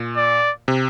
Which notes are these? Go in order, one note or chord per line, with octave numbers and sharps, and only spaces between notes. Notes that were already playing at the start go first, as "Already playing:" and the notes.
Already playing: A#2
D5
C3